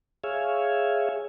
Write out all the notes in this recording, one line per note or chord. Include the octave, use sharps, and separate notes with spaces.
G#4 C#5 E5 F5 G#5